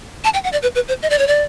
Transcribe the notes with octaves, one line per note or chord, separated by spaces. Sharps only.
A5
G5
F#5
D5
B4
B4
C5
D#5
D5
C#5
D5